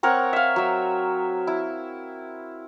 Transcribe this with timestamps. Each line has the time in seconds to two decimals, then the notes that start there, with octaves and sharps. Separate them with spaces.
0.03 C4 A#4 C#5 F#5
0.33 E5 F5
0.56 F#3 E5
1.47 E4